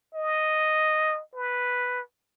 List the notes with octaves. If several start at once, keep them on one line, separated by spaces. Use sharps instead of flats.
D#5
B4